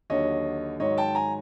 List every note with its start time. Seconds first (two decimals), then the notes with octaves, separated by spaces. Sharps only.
0.10 D#2 D3 F#3 C#5 D#5
0.80 G#2 D#3 F#3 C#5 D#5
0.98 G5 A5
1.15 G#5 A#5